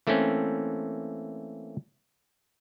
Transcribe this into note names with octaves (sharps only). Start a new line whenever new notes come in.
E3 A3 A#3 C4 C#4